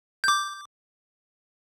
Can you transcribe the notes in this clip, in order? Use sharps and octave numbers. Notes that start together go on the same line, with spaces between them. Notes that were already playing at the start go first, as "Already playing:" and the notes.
D6 G6